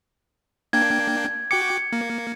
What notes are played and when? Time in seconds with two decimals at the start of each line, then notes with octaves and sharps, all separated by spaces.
0.73 A#3 D4 G5 G#6
1.51 F#4 G5 D6 C#7
1.93 A#3